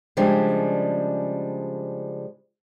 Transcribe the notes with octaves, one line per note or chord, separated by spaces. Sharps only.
C#3 F3 G3 G#3 D4